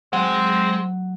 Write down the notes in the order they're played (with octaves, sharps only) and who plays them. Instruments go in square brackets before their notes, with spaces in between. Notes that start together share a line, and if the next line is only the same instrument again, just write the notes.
[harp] F#3 A3 [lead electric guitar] G#3 [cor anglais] C4 [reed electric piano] F#5